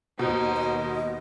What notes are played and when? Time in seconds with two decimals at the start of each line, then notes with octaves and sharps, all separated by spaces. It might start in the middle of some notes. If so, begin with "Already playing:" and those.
0.19 D#2 B2 B3 D#4 C5
0.56 D#5